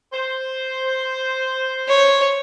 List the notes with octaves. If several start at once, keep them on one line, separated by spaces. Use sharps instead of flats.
C5
C#5